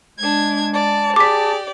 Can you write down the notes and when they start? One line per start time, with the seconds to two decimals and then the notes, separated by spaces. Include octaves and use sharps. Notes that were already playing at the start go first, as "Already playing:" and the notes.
0.19 G#3 D4 G#6
0.74 D5 A5
1.16 G4 G#4 D5 D6 B6